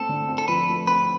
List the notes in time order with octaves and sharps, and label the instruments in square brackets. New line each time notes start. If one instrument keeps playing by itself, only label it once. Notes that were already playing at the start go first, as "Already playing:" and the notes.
Already playing: [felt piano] A3 C4 [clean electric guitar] A4
[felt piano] D3
C4
[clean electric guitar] A4
[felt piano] F3 [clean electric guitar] B4
[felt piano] A3
[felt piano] C4 [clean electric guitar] B4